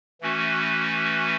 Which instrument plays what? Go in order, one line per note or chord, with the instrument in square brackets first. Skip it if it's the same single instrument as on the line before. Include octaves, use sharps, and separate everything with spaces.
[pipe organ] E3 A3 C#4 F#4 B4